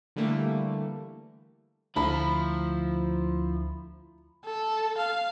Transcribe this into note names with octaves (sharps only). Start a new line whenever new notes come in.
D3 E3 G3 A3 A#3
D2 F3 E4 A#5 B5
A4
F5